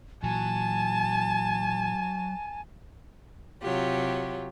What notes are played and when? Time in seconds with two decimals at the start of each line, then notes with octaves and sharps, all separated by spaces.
0.23 A#2 E3 F#3 G#5 A5
3.62 C3 F#3 F4 G4